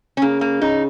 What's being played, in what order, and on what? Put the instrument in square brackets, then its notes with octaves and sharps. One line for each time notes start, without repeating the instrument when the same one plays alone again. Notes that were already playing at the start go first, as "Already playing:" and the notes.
[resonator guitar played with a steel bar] C#4
[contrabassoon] C#3 [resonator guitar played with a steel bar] A#3
[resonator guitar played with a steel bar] A#3
[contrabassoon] C#3 [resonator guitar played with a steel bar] D#4